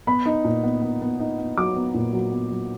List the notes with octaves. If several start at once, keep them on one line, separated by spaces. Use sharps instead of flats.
B3 B5
D#4
A#2
B3
B3
B3
D#4
B3
F#3 D6
B3
A#2
F#3
B3
F#3